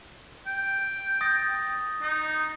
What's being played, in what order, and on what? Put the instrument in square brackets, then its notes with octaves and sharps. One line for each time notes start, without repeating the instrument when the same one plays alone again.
[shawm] G5
[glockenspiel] D#6 A6 A#6
[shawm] D#4